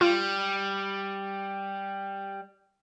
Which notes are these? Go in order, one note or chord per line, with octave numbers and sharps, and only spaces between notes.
G3 F4